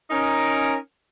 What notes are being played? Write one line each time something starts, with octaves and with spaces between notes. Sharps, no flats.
C#4 D#4 A#4